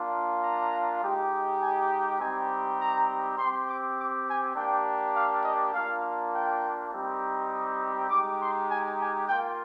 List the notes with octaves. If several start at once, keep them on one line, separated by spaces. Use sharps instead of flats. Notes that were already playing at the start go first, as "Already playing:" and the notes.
Already playing: A#3 D4 F4
A#5
G#3 D#4 G4
G#5
G3 C4 D#4 G4 G#5
A#5
C4 G4 C6
D6
D6
G#5
A#3 D4 G4 G5
F5
D#5
A#3 D4 F4 F5
G5
G3 C4 D#4 G4
D#6
G#3 D#4 G4 D6
C6
G#5
G#5
A#3 F4 G5